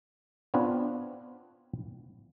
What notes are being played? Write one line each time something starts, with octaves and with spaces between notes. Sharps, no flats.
B3 C4 D4 F4 B4 C#5